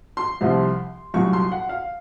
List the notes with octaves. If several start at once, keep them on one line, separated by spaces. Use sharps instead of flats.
C6
C2 C3 F3
C2 A#2 F#3 C#6
C6
F#5
F5